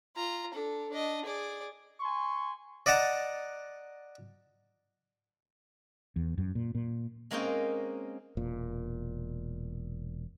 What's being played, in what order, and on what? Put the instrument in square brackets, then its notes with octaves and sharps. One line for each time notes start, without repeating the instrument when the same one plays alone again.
[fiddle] F4 A#5
D4 A4
D4 D#5
G#4 D5
[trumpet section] G#5 C6 C#6
[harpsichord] D5 D#5 F#5 A5 A#5
[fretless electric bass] E2
F#2
A#2
A#2
[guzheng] G#3 A#3 C4 C#4 D#4 G5
[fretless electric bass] E1 A#2